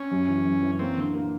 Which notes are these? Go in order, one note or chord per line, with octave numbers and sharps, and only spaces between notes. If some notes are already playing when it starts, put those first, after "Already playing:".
Already playing: C#4
F#2
E3
F#2
E3
A#3 C4
D3
A#3